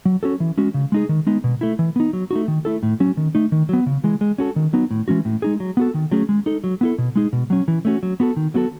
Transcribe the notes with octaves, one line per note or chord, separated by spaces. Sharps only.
F#3
C#4 F#4 A4
E3
G#3 C#4 F#4
C#3
G#3 D#4 G#4
D#3
G#3 B3 D#4
B2
A3 E4
E3
B3 D#4
F#3
A3 D#4 F#4
D#3
A3 E4 A4
A2
F#3 C#4 F#4
D#3
A3 D#4
D#3
F#3 B3
C#3
E3 G#3
G#3
C#4 F#4 A4
D#3
F#3 B3 D#4
A2
E3 G#3 C#4 F#4
A2
G#3 D#4 G#4
F#3
B3 F#4 A4
D#3
F#3 A3 C#4 G#4
G#3
D#4 A4
F#3
B3 E4 A4
B2
G#3 D#4 G#4
B2
F#3 C#4
E3
A3 C#4 F#4
F#3
B3 F#4 A4
D#3
F#3 B3 F#4 A4